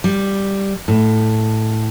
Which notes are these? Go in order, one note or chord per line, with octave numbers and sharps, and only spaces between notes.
G3
A2